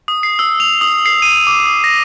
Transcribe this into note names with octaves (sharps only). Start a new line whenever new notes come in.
D#6
C7
E6
F7
D#6
C7
D#7
D6
D#6
A#6